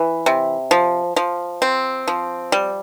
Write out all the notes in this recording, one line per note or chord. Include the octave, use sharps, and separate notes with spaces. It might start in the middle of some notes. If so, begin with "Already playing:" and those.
Already playing: E3
C3
F3
F3
C4
F3
G3